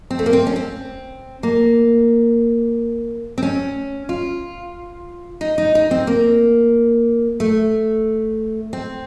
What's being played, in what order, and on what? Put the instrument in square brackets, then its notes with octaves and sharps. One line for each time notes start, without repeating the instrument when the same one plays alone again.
[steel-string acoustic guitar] C4
A3
A#3
C4
C#4
C4
A#3
C4
C#4
F4
D#4
D#4
D#4
C4
A#3
A3
C4